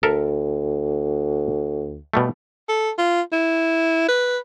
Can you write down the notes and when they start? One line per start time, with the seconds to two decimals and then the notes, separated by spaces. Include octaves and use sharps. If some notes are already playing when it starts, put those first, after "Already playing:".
0.03 D2 A4 A#4 E5
2.14 B2 G3 A3
2.68 A4
2.98 F4
3.32 E4
4.08 B4